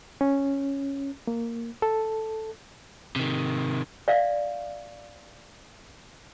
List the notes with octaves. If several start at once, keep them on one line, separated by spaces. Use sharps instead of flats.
C#4
A#3
A4
C3 D#3
D5 E5 F5